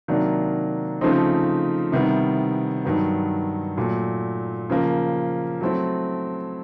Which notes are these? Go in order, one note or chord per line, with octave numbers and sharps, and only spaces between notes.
C3 D#3 F#3 A#3 D4
C#3 F3 A3 C4 D#4
C3 D#3 G3 B3 E4
G2 D#3 F#3 B3
A#2 F#3 A3
C#3 F3 A#3
F#3 A3 C4 E4 A4